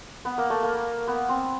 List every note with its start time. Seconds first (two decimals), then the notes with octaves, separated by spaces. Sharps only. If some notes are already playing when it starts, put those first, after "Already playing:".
0.25 B3
0.38 A#3
0.50 A3
0.63 A#3
1.08 B3
1.29 C4